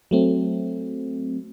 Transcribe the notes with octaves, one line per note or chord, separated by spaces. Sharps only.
F#3 A3 C4